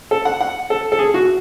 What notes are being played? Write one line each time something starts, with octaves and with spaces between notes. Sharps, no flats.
A4
F#5
F#5
A4
A4
G#4
F#4